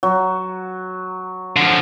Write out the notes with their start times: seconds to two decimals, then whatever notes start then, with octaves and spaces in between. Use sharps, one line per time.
0.03 F#3
1.56 D3 F3